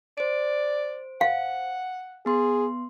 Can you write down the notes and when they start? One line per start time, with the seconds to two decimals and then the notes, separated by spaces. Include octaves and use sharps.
0.18 C5 D5 D7
1.21 F5 F#5
2.26 B3 G#4 C6